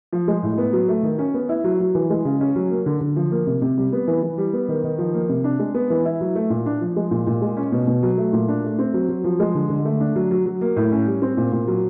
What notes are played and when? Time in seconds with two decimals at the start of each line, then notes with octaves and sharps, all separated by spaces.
0.13 F3
0.28 G#3
0.43 A2
0.58 B3
0.73 F#3
0.88 A3
1.03 D#3
1.18 C#4
1.34 B3
1.49 E4
1.64 F#3
1.80 F#3
1.95 E3
2.10 G#3
2.25 C#3
2.41 C#4
2.56 F#3
2.71 A#3
2.86 D3
3.01 D3
3.16 F3
3.31 A#3
3.47 C3
3.62 C3
3.77 G3
3.93 B3
4.07 E3
4.23 E3
4.38 G3
4.53 B3
4.68 D#3
4.84 D#3
4.98 F3
5.14 A#3
5.29 C3
5.44 D4
5.59 G#3
5.74 B3
5.90 E3
6.05 E4
6.21 F#3
6.35 A3
6.50 A#2
6.66 D4
6.81 F3
6.96 G#3
7.11 A#2
7.27 A#2
7.42 G#3
7.57 C#4
7.72 B2
7.87 B2
8.03 F#3
8.17 A3
8.33 A#2
8.48 D4
8.64 A3
8.79 C4
8.94 F#3
9.09 F#3
9.24 F3
9.40 G#3
9.55 D3
9.70 D3
9.85 A3
10.00 D4
10.16 F#3
10.31 F#3
10.46 F#3
10.61 A#3
10.76 A2
10.91 C#4
11.06 G3
11.22 C4
11.37 A#2
11.52 A#2
11.68 F#3